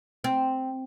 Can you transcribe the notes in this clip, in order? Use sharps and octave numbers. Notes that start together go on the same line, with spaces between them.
C4